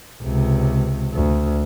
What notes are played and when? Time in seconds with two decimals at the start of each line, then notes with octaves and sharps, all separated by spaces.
0.23 C#2 C3
1.14 D2